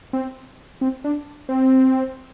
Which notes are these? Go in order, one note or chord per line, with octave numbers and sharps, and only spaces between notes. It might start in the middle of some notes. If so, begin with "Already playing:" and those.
C4
C4
D4
C4